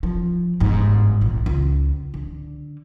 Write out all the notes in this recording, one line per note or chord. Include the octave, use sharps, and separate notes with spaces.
F3
G1 G#2
A#1
C#2
D3